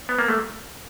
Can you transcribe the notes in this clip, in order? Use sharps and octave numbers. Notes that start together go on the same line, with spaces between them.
B3
A#3
A3